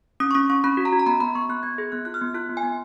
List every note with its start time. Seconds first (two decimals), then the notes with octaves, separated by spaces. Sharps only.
0.20 C#4 D#6
0.31 C#6
0.35 C#4 D#6
0.50 C#4 C#6
0.64 C#4 B5
0.77 F#4
0.85 A#5
0.93 F#4
0.99 A#5
1.06 B3 B5
1.20 B3 B5
1.35 B3 C#6
1.49 B3 F#6
1.63 B3 G#6
1.78 G#4
1.92 B3 F#6
2.05 F4 F#6
2.14 F6
2.21 B3
2.34 F4 F#6
2.49 B3
2.57 G#5
2.63 B3